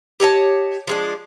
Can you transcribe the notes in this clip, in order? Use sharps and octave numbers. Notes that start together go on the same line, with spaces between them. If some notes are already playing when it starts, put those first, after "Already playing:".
G4 C#5 D#5 A5
F3 G#3 D4